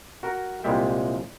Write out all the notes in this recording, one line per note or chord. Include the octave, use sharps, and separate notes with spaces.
F#4 A#4
C2 A#2 G3 G#3 E5 G5